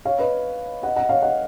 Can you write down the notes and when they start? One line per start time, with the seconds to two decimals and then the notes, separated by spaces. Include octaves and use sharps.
0.05 C#5 F5
0.19 B4 D#5
0.83 D#5 F#5
0.96 D#5 F#5
1.09 C#5 F5
1.22 D#5 F#5